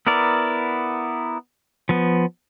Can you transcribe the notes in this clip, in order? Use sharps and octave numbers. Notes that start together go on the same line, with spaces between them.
B3 E4 A#4 D5
F3 B3